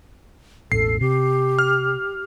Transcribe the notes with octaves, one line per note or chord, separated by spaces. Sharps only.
E1 A1 A4 C7
C3 G4
F6